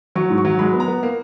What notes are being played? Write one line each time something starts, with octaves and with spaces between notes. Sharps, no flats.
F#3 C#6
G#2
C#6
F#3
G#3 B5
B3
A#5
B3
A#3